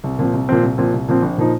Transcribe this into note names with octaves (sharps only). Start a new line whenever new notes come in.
C2
A#2 F3 C4
C2
A#2 F3 C4
C2
A#2 F3 C4
C2
A#2 F3 C4
A#1
A#2 F3 D#4 C5